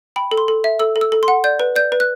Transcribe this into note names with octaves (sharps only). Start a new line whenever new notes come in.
G5 B5
A4
C6
A4
E5
A4 E6
A4
E6
A4
C6
F#5
D5 G6
B4
D5 G6
B4
F#6